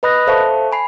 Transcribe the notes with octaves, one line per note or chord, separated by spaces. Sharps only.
B4 D#5 B5 D#6 F#6 A#6
A4 C5 E5 F5 A5 C#6
G#5 B5 C7